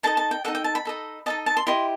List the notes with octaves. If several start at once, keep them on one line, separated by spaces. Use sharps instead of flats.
D#4 A4 D#5 A5
A5
G5
D#4 A4 D#5 F#5
G5
A5
B5
D#4 A4 D#5
D#4 A4 D#5 A5
A5
C6
E4 G4 D#5 C6